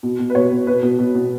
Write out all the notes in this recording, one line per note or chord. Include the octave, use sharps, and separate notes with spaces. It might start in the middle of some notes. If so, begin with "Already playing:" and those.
B2
B2
B4
B2 C#5
B2
B2 B4
B2
B2
B2